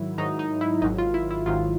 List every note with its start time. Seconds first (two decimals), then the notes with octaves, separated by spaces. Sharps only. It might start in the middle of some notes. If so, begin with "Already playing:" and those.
Already playing: G#2 D#3 F#3 E4
0.18 G#2 D#3 F#3 D#4
0.39 D#4
0.61 E4
0.82 G#1 G#2 D#3 F#3 D#4
0.98 F4
1.14 E4
1.31 E4
1.46 G#1 G#2 D#3 F#3 F4